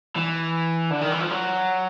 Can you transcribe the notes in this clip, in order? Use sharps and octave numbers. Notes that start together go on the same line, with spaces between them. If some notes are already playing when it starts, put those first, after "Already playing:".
E3
D3
D#3
E3
F3
F#3